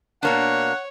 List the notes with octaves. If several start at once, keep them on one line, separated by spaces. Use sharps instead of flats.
B2 A#3 D4 C#5 F#5